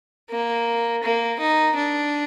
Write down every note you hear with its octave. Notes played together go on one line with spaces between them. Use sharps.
A#3
A#3
D#4
D4